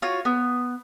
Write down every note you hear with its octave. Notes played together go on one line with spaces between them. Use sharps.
F4 F#4 C#5
B3